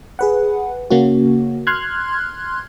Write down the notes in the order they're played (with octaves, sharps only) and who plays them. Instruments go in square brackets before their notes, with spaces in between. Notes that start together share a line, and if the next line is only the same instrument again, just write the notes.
[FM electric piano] G#4 B4 F#5
C#3 A#3 C#4 F#4
C6 F6 F#6 G#6